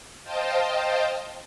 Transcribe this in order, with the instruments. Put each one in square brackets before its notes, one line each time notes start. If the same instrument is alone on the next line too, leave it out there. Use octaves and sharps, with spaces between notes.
[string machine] C5 D#5 F5 G5 A5